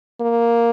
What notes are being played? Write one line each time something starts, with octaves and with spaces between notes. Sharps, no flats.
A#3